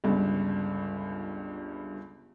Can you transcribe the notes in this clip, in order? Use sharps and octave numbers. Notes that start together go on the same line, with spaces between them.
G1 C#2 G2